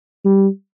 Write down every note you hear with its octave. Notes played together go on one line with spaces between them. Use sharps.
G3